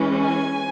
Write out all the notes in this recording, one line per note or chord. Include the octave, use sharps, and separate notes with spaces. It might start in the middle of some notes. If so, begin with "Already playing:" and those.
Already playing: E3 G#3 C#4
G#5